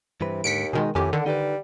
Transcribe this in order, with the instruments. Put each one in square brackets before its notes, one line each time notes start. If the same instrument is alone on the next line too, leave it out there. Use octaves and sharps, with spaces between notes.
[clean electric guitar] G2 E3 B4 [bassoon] C3
[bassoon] D#2 [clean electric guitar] G#2 D3 [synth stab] B6 C#7 D7
[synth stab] B2 D#3 G#3 [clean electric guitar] D#4 G#4
[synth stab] F2 D#3 G4 [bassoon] A2 [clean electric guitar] G#5
[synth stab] D3 D#3 [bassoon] D4 [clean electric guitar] F#5
[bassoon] G3 [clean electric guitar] D#4 B4